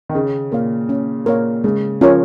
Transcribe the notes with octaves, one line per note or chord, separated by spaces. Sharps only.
D#3
C#3 C#4
A#2 A#4 C#5 F5
C#4
A#2 A#4 C#5 F5
C#3 G#3
F3 C#4 F4 A#4 C#5